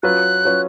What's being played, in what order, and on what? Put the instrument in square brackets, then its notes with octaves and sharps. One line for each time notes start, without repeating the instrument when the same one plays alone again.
[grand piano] F#3 C#4 F4 B4 [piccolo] F#6
[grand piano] F#3 C#4 F4 B4